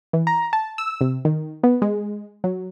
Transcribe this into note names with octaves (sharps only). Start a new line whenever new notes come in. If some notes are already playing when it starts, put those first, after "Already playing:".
E3
A#5
A5
E6
C3
D#3
B3
G#3
F#3